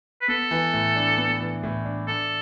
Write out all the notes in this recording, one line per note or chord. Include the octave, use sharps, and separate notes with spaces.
B4
B3 A4
E3
A2
D4
B3
E3
A2
D4
D4 A4